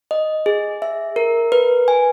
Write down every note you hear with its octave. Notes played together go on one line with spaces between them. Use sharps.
D#5
G#4
E5
A#4
B4
G#5